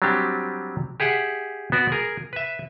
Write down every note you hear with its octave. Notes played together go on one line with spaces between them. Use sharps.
F#3 G3 C4 D4 G4
G4 G#4 E5 F#5
B3 F#4 D5
G#4 A#4
B4 E5